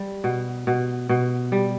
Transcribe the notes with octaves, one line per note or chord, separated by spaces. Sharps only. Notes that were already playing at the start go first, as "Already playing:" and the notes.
Already playing: G3
B2
B2
B2
G3